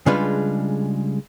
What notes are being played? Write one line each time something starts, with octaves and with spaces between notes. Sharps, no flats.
C#3 G3 G#3 D4 F4 B4